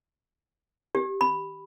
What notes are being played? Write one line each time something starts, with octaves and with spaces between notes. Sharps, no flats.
G4
B5